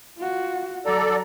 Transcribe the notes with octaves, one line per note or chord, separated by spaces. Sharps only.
F4 F#4
F#3 A4 D5 A#5